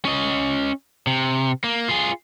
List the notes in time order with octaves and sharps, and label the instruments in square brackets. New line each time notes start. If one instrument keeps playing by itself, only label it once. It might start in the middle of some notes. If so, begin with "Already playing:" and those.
[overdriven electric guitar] C#4 D#5
C3
A#3
F4 G#4